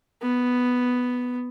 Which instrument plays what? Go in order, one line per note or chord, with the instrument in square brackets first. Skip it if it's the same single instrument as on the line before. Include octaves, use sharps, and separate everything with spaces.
[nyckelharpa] B3